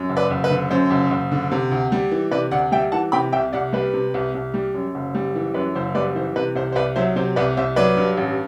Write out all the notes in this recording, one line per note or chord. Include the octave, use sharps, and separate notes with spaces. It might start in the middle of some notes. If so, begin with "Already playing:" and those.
Already playing: F#2
F#1
B4 D5
F#1
B4
D3
F#2 C5
F#1
F#1
D3
C3
D2
G3
E3
C3 B4 D5
D2 D5 F#5
G3 E5 G5
E3 F#5 A5
C3 G5 B5
C2 E5 G5
C2 D5 F#5
G3 B4
C3
C2
C2
G3
F#2
F#1
G3
E3
F#2 B4
F#1 C5
G3 B4 D5
E3 C5
C3 B4
C2 C5
C5
C2 B4 D5
F#3 C5 E5
C3 C5
C2 B4 D5
C2 C5 E5
F#3 B4 D5
G2
A1